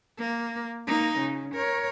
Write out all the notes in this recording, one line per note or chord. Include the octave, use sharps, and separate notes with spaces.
A#3
A#3 D#4
C#3
A#4 C#5